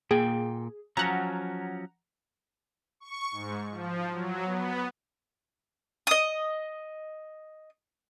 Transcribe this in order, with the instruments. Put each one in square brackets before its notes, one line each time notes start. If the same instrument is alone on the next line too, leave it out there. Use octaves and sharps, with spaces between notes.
[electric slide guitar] A#2 A#3 G5 [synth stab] G#4
[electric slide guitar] F3 F#3 C#4 [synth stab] F#5 A#5
[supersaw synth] C#6
G#2
F3
F#3
B3
[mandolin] D#5 D#6